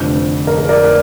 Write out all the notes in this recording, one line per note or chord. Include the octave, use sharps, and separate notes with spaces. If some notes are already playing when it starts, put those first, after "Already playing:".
Already playing: F1 F2 D3
A#4
A#4
A#4 D5